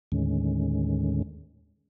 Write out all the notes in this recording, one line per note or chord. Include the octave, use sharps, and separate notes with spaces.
D#2 A2 D3 D#3 G#3 C#4